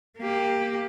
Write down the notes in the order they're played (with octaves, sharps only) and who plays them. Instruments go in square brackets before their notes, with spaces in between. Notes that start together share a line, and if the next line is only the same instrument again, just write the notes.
[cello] A#3 G4